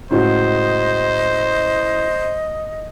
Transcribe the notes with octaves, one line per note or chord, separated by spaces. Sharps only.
C#2 A2 F#4 C5 D#5